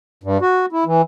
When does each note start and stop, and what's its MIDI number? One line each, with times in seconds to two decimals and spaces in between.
0.24 0.38 43
0.42 0.66 66
0.72 0.84 64
0.86 1.02 52